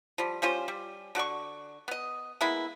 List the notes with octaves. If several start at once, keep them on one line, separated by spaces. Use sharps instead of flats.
F3 G3
G3 C#4 F4 C5
G3
D3 F#4 D5 C#6
B3 D#5
G#3 A#3 B3 E4